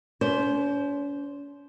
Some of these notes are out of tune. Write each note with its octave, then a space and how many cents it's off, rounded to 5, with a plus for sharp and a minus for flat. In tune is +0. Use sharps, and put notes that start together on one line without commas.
C#4 +45 C5 +0